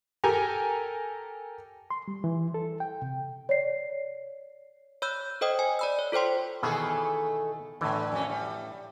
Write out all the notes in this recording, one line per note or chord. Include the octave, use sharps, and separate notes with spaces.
G4 A4 A#4 G#5 A#5
C6
G3
E3
A4
G5
C3
C#5 D5 C7
C#5 B5 E6 G6
A4 C5 D#5 G5 D#6
G#5
D5 B5 E6
C#5
F4 A4 C5 G5 C6
B2 D#3 E3 A3 G#4 A4
A2 D3 E3
F2 C#4
G3